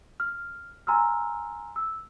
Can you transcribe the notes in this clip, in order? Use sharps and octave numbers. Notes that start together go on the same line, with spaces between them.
F6
G#5 A#5 C6 E6 F6
E6